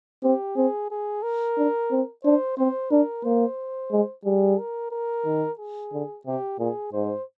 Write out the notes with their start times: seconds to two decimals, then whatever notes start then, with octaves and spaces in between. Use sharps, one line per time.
0.23 C4 G4
0.56 C4 G#4
0.91 G#4
1.23 A#4
1.57 D4
1.91 C4
2.24 D4 C5
2.58 C4 C5
2.91 D4 A#4
3.24 A#3 C5
3.91 G#3
4.25 G3 G#4
4.58 A#4
4.91 A#4
5.25 D#3
5.59 G#4
5.92 D3
6.25 C3 G4
6.59 A#2 G#4
6.93 G#2 C5